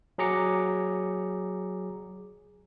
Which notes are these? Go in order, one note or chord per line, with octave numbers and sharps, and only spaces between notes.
F#3 G#4 A#5 D6 C#7